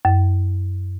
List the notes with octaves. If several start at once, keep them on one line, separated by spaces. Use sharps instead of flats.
F#2